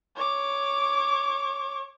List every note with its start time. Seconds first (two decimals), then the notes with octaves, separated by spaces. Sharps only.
0.16 C#5 D6